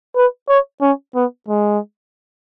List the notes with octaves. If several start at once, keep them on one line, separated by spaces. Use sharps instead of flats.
B4
C#5
C#4
B3
G#3